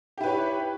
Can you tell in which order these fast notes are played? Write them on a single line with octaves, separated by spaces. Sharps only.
G4 E4 B4 C#5